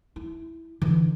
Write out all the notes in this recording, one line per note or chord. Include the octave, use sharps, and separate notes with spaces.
E4
D3 E3